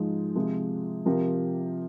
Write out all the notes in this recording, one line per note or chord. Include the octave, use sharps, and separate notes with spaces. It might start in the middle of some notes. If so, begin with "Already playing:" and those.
Already playing: G#2 F3 G#3 D#4
C3 F3 G#3
C3 F3 C4 G4 A#4